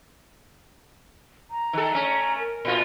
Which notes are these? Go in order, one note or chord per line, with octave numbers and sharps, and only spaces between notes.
A#5
D#3 A4
A3 C#4
A#4
A#2 F4